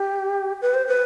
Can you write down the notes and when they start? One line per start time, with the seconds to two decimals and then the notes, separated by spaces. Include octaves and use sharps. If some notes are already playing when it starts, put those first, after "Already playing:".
Already playing: G4
0.62 B4
0.74 C5
0.87 B4